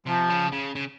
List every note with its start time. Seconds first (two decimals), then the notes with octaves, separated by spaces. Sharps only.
0.06 C3 F3
0.30 C#3
0.52 C#3
0.75 C#3